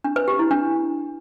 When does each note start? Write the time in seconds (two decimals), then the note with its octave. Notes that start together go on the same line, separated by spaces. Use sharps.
0.04 D4
0.16 B4
0.28 G4
0.39 E4
0.51 D4